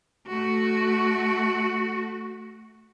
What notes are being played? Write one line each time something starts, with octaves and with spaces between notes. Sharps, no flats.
A3 F#4